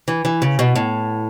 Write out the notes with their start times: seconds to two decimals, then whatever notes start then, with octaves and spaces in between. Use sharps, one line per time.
0.08 E3
0.25 E3
0.42 C#3
0.59 B2
0.76 A2